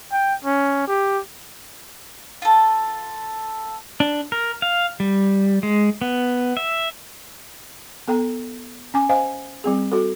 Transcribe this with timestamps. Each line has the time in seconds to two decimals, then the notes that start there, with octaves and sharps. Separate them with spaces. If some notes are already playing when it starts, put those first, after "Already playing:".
0.12 G5
0.44 C#4
0.88 G4
2.42 F4 A4
4.00 D4
4.32 A#4
4.62 F5
5.00 G3
5.63 G#3
6.01 B3
6.57 E5
8.08 B3 A4 G5 A#5
8.94 C#4 G#5 D6
9.09 C5 D#5 F5 G#5
9.64 G3 C4 G#4
9.92 F#4 A4